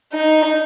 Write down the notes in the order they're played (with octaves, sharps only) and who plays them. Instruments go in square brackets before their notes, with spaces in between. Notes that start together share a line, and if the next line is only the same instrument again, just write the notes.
[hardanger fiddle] D#4